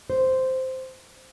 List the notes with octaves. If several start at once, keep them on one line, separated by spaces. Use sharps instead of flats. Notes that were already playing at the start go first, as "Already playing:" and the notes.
C5